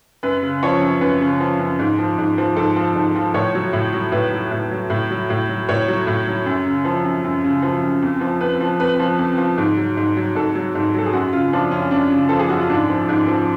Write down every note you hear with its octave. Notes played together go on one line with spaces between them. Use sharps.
F#2 B4
C#3
F3 C#5
F#2
F#2 B4
C#3
F3
F#2
G#2
F3
G#2
F3
G#2 A4
F3
G#2
F3
A2 C#5
F#3
A2
F#3
A2 B4
F#3
A2
F#3
A2
F#3
A2
F#3
A2 C#5
F#3
A2
F#3
F#2
C#3
F3
F#2
F#2
C#3
F3
F#2
F2
F3
F2 B4
F3
F2 B4
F3
F2
F3
G#2
F#3
G#2
F#3
G#2 A4
F#3
G#2
F#3 A4
G#4
F#2 F#4
C#3 F4
F3 D4
F#2 C#4
F#2 D4
C#3
F3 A4
G#4
F#2 F#4
F4
G#2 D4
F3
G#2
F3